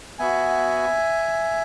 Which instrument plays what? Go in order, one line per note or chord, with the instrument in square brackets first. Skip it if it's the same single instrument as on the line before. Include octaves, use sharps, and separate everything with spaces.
[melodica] B3 F#4 E5 G#5